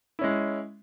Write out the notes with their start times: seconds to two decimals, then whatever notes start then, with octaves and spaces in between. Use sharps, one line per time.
0.19 E4
0.21 C#4
0.24 G#3